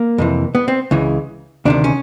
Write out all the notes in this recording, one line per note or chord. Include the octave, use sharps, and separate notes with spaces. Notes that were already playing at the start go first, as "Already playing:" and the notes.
Already playing: A#3
F2 C3 E3
B3
C4
C#2 C#3 E3
D2 C3 D#3 D4
C#4